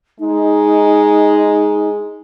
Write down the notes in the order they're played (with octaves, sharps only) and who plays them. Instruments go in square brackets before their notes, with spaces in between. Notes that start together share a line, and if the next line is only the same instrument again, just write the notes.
[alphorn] G#3 [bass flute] D#4